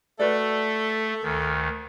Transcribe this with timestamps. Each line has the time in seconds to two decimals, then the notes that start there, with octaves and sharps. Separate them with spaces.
0.19 A3 F#4 A4 B4 D5
1.23 D2 D#3